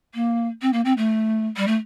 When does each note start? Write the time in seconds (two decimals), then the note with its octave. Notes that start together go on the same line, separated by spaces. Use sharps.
0.15 A#3
0.62 C4
0.73 A#3
0.85 C4
0.97 A3
1.57 G3
1.67 A3